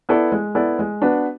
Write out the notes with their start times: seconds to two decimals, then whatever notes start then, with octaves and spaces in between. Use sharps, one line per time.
0.09 B3 E4 A4 D5
0.32 G#3
0.55 B3 E4 A4 D5
0.79 G#3
1.02 B3 D4 F#4 B4